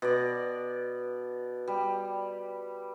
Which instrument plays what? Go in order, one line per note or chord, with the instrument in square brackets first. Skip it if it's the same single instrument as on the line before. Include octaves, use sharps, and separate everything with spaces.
[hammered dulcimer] B2 D5
G3